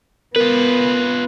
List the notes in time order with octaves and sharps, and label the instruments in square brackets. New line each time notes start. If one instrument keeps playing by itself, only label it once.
[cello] B3 [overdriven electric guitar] F4 B4 [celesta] A#4